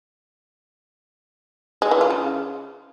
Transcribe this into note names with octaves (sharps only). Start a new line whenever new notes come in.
G#3
E3
F4
C#3